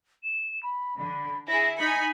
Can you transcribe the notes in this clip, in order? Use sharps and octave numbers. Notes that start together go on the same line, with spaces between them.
E7
B5
D3 B5
E4 G#4 A#6
D#4 G#5 B5 C#7